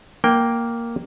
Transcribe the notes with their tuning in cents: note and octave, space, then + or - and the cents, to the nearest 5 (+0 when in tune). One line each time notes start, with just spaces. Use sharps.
A#3 +0 G5 +0